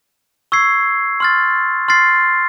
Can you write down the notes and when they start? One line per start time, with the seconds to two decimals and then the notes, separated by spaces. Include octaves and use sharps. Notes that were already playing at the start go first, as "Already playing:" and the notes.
0.52 C#6 E6 G#6 C7
1.20 C6 F6 A6
1.88 C6 F6 A6 C7